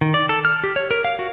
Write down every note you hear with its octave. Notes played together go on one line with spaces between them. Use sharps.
D#3
D5
A4
F6
G4
C#5
A#4
F5
F#4